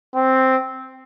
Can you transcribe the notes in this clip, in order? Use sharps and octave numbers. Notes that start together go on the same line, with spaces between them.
C4